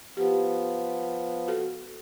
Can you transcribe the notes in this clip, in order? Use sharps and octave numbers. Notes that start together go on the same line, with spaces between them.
F3 B3 G4
F#4 A4